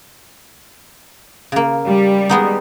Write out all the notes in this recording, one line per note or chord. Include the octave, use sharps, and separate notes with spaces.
C#3 A#3
G3
G#3 B3 D#4